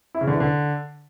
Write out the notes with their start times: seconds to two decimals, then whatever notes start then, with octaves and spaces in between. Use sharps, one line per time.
0.15 E4
0.21 C#3
0.27 D3
0.34 E3
0.40 D3